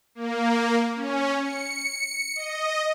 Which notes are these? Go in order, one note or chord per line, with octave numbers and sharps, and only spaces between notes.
A#3
C#4
C#7
D#5